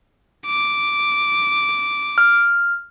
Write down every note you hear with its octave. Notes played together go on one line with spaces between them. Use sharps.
D6
F6